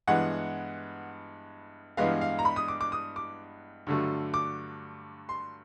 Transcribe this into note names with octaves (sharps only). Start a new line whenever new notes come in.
G2 E3 G#3 B3 F#5
G2 E3 G#3 B3 F5
F5
A#5
B5
D#6
D6
D6
D#6
D6
G2 D3 F#3 A3
D6
C6